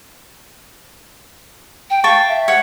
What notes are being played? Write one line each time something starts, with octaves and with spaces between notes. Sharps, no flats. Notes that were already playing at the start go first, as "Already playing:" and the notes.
G5
F5 G5 A5 C#6
E5
C#5 F#5